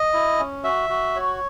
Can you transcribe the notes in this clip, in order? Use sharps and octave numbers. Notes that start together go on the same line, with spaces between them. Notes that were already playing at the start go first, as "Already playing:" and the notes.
Already playing: D#5
E4
C#4
F#4 E5
F#4
C#5